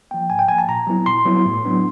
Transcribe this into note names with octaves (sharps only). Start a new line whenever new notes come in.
F3 A#3 G5
G#2 G#5
G5
F3 A#3 G#5
A5
A#2 A#5
F#3 B3 E4
A#2 C6
F#3 B3 E4
A2
F#3 B3 D4